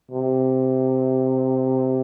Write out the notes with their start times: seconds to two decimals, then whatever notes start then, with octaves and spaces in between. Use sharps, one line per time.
0.11 C3